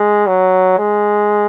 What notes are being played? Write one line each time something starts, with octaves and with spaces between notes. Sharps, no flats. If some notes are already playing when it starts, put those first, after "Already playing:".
Already playing: G#3
F#3
G#3